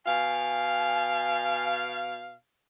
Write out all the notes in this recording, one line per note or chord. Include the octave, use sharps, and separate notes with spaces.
B2 F5 G#5